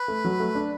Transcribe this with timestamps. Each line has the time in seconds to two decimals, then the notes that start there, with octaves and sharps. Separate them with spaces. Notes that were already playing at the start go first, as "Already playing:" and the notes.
Already playing: B4
0.08 A3
0.25 F#3
0.40 A3
0.55 D4